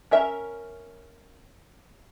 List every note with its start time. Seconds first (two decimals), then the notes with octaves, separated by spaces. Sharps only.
0.11 C#4 A#4 E5